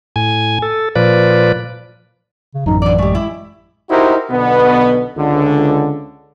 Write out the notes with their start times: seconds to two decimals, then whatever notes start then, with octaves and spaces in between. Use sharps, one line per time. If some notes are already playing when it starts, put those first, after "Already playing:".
0.16 A2 G#5
0.62 A4
0.96 A#2 F3 B4 D5
2.54 C#3
2.66 A1 F#2 D#4
2.82 D3 E3 D5
2.98 G#3 A3 G4
3.15 E4
3.90 D#4 E4 F#4 G4 A#4 C5
4.30 B1 B2 D3 B3
5.17 C#2 D3